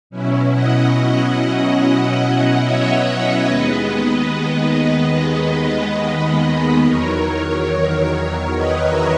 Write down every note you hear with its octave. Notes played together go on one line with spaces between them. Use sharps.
B2 F#3 C#4 E4
D#5 F#5
C#5 E5
D#2 D#3 G#3 B3 B4 D#5
E2 D#3 F#3 A#4 C#5
B4 D#5
C#5 E5